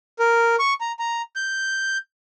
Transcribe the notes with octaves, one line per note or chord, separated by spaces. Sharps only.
A#4
C#6
A#5
A#5
G6